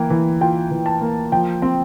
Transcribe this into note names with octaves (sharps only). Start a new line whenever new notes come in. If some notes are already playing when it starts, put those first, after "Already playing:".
Already playing: E3 A#3 G5
E3
F4 G5
E3
A5
A#3
F3 G5
C4